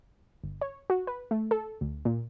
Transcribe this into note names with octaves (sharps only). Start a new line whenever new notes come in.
G1
C#5
F#4
B4
A3
A4
D2
A#2